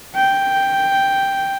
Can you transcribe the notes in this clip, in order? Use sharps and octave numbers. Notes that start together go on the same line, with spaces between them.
G5